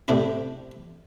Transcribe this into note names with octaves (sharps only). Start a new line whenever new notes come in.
A2 C3 D4 E4